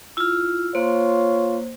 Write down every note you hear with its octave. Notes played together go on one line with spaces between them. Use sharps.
E4 F4 E6 F6
A#3 F4 C5 C#5